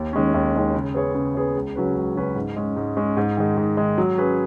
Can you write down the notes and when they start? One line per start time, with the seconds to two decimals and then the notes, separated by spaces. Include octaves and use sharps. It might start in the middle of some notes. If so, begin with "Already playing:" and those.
Already playing: D#2
0.13 D#3 G#3 C#4
0.34 D#2
0.54 D#3 G#3 C#4
0.74 C#3
0.94 B3 G#4 C#5
1.15 C#3
1.34 B3 G#4 C#5
1.55 C#2
1.75 C#3 F#3 C#4 B4
1.96 C#2
2.15 C#3 F#3 C#4 B4
2.36 G#2
2.56 G#3 C#4
2.76 G#2
2.97 G#3 C#4
3.17 G#2
3.37 D#3 G#3
3.57 G#2
3.77 D#3 G#3
3.98 F#3
4.18 C#4 G#4 B4